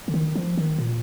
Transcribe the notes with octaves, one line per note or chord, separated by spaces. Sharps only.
D3
D#3
F3
D#3
A#2